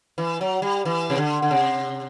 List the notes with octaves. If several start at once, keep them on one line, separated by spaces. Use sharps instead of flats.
E3
F#3
G3
E3
C3
D3
D3
C3